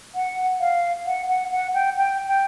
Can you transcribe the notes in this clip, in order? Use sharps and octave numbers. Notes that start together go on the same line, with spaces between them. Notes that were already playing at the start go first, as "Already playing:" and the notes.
F#5
F5
F#5
F#5
F#5
G5
G5
G5